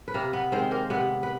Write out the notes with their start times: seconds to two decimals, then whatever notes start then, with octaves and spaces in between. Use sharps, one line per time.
0.08 B4
0.14 C3 A#3 A#4
0.33 B3 B4
0.52 D#3 G#3 C4 C5
0.71 A#3 A#4
0.90 C3 B3 B4
1.23 B4